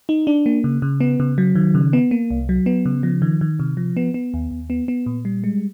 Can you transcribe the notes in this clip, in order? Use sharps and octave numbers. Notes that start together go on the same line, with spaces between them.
D#4
D4
A#3
C#3
C#3
B3
C#3
F#3
D#3
C#3
B3
A#3
C2
F#3
B3
C#3
F3
D#3
D#3
C3
F3
B3
B3
D#2
D#2
B3
B3
A#2
G3
G#3